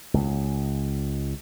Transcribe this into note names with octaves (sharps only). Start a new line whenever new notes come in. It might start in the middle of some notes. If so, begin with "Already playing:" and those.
C#2